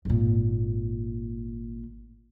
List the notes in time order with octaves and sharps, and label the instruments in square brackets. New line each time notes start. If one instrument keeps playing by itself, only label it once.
[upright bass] G#1 A#2